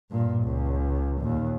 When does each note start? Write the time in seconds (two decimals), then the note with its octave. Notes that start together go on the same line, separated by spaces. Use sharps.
0.10 G2 A#2
0.43 C#2
1.18 D#2 A#2